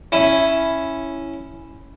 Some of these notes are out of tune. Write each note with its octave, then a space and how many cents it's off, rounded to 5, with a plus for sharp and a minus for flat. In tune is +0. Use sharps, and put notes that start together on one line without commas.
C#4 +0 E4 +0